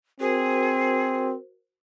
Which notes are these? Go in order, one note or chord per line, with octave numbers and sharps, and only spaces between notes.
C4 F#4 G#4 A#4 C5